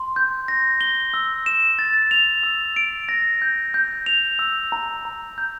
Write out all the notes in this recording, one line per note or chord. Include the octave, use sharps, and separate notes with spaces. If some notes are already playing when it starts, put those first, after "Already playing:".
Already playing: C6
G6
A#6
G7
E6
E7
A6
F7
E6
D7
A#6
G6
G6
F7
E6
A#5
A#5
G6